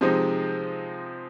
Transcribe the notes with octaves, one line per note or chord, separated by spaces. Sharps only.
C3 F3 G#3 C4 D#4